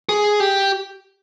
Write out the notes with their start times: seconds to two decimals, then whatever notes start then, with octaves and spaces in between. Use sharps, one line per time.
0.09 G#4
0.40 G4